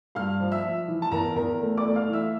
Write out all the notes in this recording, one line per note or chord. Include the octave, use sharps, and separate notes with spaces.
G2 F5 F6
F3
E5 E6
F3
E3
A5
E2 A#4 A#5
E2 A#4 A#5
A3
D5 D6
A3
F5 F6
E3
E5 E6